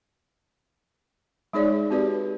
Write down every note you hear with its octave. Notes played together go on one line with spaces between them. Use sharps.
G#3 D#4 G#4 C#5 D5
C4 F#4 G4 B4 D5